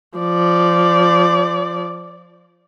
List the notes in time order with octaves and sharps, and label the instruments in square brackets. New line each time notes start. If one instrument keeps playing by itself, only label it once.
[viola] F3 D5